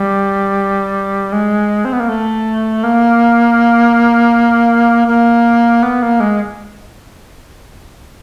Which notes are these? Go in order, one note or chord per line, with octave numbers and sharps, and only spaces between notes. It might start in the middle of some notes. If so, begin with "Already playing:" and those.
Already playing: G3
G#3
C4
B3
A#3
A3
A#3
A#3
B3
A#3
G#3